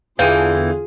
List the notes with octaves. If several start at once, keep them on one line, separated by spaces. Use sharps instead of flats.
E2 D3 E3 F4 G#4 F5 G5 D#7